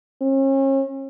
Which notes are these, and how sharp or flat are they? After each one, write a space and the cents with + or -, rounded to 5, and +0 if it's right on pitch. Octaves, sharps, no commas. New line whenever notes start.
C#4 -40